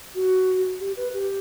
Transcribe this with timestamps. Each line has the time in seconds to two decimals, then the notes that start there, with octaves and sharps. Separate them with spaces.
0.15 F#4
0.80 G4
0.97 B4
1.13 G4